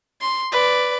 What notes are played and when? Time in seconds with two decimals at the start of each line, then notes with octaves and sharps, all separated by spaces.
0.21 C6
0.52 B4 D5